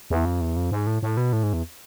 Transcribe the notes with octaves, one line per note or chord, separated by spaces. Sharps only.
E2
F2
E2
F2
G#2
A2
A2
B2
A2
G#2
E2